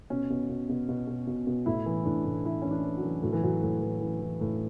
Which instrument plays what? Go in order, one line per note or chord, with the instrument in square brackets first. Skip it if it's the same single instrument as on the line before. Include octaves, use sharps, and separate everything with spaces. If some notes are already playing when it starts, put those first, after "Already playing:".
[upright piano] B2 C#4
B2
B2
B2
B2
B2
B2
B2
A2 E4
E3
A2 D4
A2
E3 E4
E3 C#4
D4
E3
F#3
E3
A2 F#3
E3
A2 F#3
A2
E3
E3
E3
A2